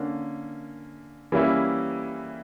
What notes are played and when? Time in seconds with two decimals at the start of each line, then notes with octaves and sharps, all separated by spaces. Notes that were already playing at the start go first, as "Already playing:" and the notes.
Already playing: D3 A#3 C#4
1.32 E3 G3 A#3 C#4 E4